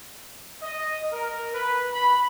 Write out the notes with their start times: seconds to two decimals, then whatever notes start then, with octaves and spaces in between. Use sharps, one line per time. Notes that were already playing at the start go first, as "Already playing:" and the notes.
0.61 D#5
1.12 A#4
1.53 B4
1.92 B5